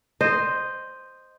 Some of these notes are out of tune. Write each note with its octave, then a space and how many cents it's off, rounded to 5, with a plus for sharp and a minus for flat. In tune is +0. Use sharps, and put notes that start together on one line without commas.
C5 +0 D#5 -10